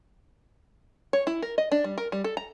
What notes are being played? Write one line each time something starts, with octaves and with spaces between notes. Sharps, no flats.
C#5
E4
A#4
D#5
D4
G3
A#4
G3
A4
A#5